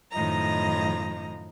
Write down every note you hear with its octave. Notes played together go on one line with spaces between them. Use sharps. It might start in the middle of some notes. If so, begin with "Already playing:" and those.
F#2 A2 D#3 F3 D#5 A#5